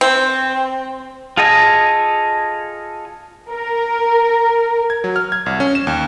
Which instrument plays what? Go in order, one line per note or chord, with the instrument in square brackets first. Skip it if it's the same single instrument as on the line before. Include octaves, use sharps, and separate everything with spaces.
[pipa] C4
[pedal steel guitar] F4 G#4 A4 D#5 G#5
[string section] A#4
[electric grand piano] G#6
F#3
F6
G#6
C2
C#4
E7
D#2